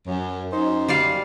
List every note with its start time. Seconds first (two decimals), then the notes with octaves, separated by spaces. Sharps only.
0.07 F#2
0.53 F#2 D#4 C5
0.88 G3 D5 F5